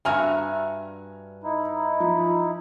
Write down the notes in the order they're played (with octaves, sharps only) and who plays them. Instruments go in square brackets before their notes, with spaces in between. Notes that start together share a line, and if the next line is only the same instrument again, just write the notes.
[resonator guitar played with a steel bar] G2 F#4 E5 [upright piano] G#5 A#5 F6
[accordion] D#4 E4
[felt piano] F3